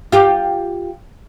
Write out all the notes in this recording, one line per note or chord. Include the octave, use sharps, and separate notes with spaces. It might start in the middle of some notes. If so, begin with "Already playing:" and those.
F4 G4